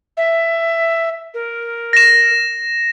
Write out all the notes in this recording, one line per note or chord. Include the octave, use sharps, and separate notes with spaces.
E5
A#4
A#6 E7